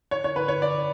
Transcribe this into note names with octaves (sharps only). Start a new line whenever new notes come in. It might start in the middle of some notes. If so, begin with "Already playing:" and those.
C#5
C#5
B4
C#5
D5